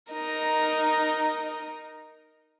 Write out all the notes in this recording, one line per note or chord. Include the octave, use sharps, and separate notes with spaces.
D#4 A#4 D#5